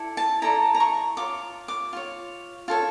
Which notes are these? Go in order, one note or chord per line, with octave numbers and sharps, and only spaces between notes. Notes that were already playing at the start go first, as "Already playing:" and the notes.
Already playing: E4 A4 D5
A5
E4 A4 D5 A#5
A#5
C#6
F4 C#5 D6
D6
F4 C#5
F4 A4 C#5